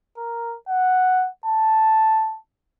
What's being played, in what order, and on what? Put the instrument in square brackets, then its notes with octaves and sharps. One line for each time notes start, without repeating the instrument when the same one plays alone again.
[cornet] A#4
F#5
A5